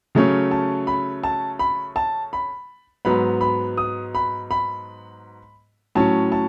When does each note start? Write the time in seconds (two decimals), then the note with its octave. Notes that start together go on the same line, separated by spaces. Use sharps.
0.15 C#3 F#3 A3 C#4
0.51 A5
0.87 B5
1.23 A5
1.59 B5
1.96 A5
2.33 B5
3.05 G#2 F#3 B3 B5
3.41 B5
3.77 D#6
4.15 B5
4.51 B5
5.95 A2 F#3 C#4 A5
6.32 A5